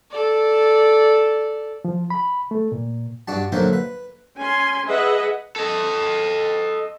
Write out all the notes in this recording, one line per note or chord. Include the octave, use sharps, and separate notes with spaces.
A4 D5
F3
B5
A3
A#2
G2 D4 F#4 A5
D3 F#3 A3 A#3 F4 C5
B4
C#4 G#5 C6
G#4 B4 D#5 E5 F#5
A4 D#5